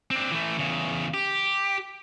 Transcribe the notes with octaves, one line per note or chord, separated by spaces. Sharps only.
C4 D4
E3 A3
E2 C#3
G4